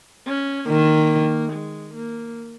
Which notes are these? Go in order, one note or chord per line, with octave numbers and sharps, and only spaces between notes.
C#4
D#3 A#3
G#3
A#3